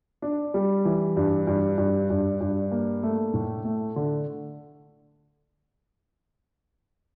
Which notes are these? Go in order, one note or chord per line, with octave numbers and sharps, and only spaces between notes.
D4
G3
E3
G2
G2
G2
G2
G2
A#3
A3
A2
A3
D3